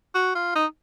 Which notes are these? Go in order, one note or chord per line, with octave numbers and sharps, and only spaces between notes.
F#4
F4
D#4